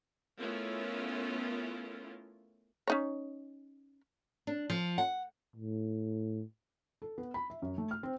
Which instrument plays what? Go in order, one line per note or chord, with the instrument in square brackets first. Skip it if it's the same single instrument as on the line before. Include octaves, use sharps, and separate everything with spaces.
[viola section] A3 B3 C#4 E4 F4 A#4
[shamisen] C#4 D#4 C#5
[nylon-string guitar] D4
F3
F#5
[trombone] A2
[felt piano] A4
B3
B5
E5
F#2
A3
F6
C4